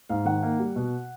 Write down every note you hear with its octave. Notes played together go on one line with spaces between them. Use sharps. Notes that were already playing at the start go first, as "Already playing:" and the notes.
G#2 F5
D#3 F#5
A#3
G3
B2